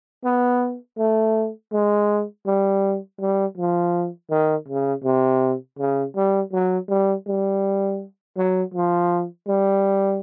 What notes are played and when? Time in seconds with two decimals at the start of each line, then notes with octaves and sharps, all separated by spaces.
0.24 B3
0.98 A3
1.72 G#3
2.47 G3
3.20 G3
3.57 F3
4.30 D#3
4.68 C#3
5.04 C3
5.79 C#3
6.16 G3
6.53 F#3
6.89 G3
7.27 G3
8.37 F#3
8.74 F3
9.48 G3